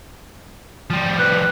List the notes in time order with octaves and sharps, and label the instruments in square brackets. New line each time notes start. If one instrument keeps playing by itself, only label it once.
[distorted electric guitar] F3 G3
[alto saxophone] B4